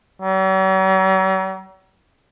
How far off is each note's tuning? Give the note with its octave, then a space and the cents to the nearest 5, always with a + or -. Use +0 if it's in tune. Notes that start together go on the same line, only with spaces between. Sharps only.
F#3 +45